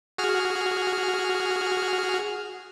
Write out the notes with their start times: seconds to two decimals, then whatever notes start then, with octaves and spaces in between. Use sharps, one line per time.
0.18 F#4 G#4 F6